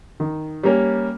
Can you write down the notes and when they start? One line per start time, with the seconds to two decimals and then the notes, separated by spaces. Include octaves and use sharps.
0.20 D#3
0.63 G3 A#3 C#4